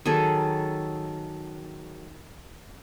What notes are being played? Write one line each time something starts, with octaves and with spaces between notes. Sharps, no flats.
D#3 F#3 G#4 A4